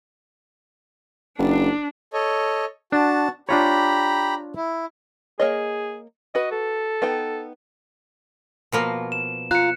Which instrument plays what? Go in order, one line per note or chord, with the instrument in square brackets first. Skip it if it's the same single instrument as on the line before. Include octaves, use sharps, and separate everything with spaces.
[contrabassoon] F#1 [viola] D4
[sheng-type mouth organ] A4 C#5 D#5
[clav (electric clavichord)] D4 [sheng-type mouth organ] F#4 A5
[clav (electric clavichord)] D4 F4 C#5 [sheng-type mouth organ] G4 A#5 B5
[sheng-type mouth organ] E4
[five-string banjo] A#3 C#5 D#5 [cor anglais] G#4
[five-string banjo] F#4 B4 [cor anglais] D#5
[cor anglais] A4
[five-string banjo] B3 D#4 G5
[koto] B2 F3 A#3
[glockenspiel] E7
[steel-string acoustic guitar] F4 F5 A#5 [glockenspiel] F#6 C#7